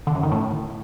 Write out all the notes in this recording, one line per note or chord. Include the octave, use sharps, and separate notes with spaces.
D3
F#2
D#3
A2